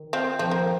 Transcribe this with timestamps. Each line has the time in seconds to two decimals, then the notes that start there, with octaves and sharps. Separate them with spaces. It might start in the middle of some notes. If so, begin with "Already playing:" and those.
Already playing: D#3
0.13 C4 F4
0.39 F3 C4
0.51 A#3